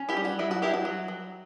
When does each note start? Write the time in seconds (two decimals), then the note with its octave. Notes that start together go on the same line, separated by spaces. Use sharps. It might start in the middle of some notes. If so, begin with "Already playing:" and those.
Already playing: C#4
0.09 E4 G4
0.17 G3
0.25 F#4
0.39 F#3 E4
0.51 F#4
0.62 F#3 E4 G4
0.73 F#4
0.85 F#3
1.08 F#3